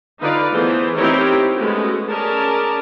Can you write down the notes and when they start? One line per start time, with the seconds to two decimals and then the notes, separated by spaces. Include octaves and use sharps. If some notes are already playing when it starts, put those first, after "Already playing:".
0.20 D3 D#4 F4 B4 D5 F5
0.52 E3 A3 B3 G#4 C5
0.96 C4 D#4 E4 G4 A#4 C#5
1.56 G#3 A3 B3 C#4 F#4
2.07 C#4 G#4 A#4 D5 A5